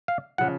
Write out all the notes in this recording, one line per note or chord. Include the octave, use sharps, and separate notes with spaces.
F5
C#3 F3 F#5